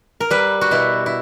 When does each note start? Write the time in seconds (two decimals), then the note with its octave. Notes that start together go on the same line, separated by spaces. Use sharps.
0.20 A#4
0.30 G3 B4
0.61 F#4
0.71 B2 E4
1.06 E4